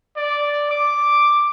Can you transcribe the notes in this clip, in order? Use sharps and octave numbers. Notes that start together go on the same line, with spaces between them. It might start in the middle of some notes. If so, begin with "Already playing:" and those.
D5
D6